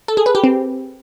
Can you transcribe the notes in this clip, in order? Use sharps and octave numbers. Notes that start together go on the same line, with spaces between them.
A4
G#4
B4
G4
C4